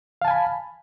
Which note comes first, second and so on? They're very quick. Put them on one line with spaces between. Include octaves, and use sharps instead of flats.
F5 A5 G#5 B5